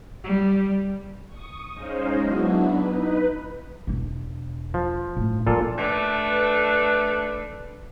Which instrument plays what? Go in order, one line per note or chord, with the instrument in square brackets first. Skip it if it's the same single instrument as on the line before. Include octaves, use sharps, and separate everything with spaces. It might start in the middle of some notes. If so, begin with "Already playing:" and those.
[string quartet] G3
[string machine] C#6 D#6
G#3 C#4 D#4 C5 D#5 F5
F#3 B3 D4 E4 F#4
D#4 B4
[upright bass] E1 D4
[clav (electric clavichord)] F3
[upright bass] A2 A3
[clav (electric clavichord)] A#2 F4 A4 [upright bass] E3 F3
[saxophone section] A3 D4 B4